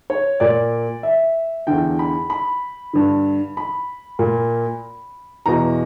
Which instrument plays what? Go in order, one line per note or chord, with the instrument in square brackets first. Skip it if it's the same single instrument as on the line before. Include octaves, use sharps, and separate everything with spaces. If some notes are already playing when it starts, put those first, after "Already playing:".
[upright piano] C#5
A#2 D5
E5
E2 D3 G5
B5
B5
G2 D3
B5
A#2
E2 B2 A#5